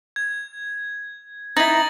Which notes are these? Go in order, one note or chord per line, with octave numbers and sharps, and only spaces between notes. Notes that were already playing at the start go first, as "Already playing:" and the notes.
G#6
D#4 E4 A6 A#6 F#7